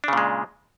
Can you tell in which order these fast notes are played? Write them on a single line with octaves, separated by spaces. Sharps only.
D4 C#3 A#2 G#3